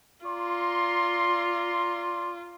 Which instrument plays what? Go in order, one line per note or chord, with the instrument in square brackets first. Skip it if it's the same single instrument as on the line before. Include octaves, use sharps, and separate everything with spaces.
[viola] F4 [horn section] D5 A#5 C6